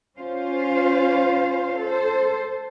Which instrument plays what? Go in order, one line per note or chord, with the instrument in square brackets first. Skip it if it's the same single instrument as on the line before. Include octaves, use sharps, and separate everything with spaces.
[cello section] C#4 F4 C5 F5
A4 C5